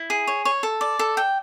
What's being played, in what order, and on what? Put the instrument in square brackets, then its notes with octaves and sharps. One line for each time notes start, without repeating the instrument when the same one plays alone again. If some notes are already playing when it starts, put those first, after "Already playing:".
Already playing: [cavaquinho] E4
G#4
C#5
C#5
A4
D5
A4
G5